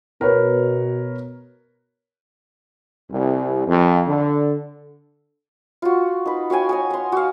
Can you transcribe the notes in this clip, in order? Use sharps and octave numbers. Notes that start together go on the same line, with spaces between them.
B2 A#4 B4 C#5
C2
F2
D3
F4 F#4
D#4 B4
F#4 F5 G5 G#5
C#5 D#5 G#5
F#5 C6
F#4 F5